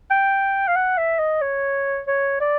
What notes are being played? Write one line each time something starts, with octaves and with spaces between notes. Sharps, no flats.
G5
F5
F#5
E5
D#5
C#5
C#5
D5